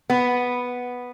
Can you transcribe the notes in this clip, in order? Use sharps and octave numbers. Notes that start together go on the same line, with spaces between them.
B3